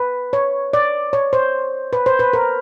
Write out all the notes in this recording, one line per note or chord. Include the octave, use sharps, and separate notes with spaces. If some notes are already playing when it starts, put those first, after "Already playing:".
Already playing: B4
C#5
D5
C#5
C5
B4
C5
B4
A#4